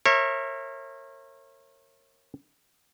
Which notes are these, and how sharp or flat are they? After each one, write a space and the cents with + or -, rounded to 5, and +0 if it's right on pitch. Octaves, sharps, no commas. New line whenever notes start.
A#4 -20 C#5 -35 E5 +0